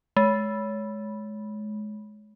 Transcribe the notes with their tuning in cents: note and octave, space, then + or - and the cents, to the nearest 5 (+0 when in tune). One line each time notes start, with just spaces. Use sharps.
G#3 +30